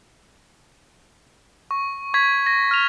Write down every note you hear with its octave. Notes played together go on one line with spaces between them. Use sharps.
C#6
C#6 G#6 B6
A#6
F6 F7